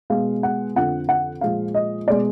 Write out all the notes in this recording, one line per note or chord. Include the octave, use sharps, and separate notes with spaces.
B2 G#3 F5
F#5
F2 D3 F3 F#5
F#5
A#2 F3 G#3 F5
D#5
B2 G#3 D5